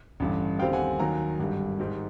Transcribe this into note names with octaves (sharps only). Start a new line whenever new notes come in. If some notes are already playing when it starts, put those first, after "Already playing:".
A1 G2 D3
D#2 D3 G3 C4 F5 G5
F#5 G#5
D#2 D#3 F#3 G#5 A#5
G#1 G2 D3 G3
G#2 D#3 G3